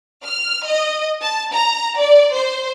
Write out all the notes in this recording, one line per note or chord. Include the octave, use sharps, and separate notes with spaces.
F6
D#5
A5
A#5
D5
C5